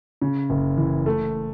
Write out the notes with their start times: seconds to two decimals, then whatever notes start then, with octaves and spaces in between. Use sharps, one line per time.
0.22 C#3
0.50 F#1
0.77 E3
1.06 A3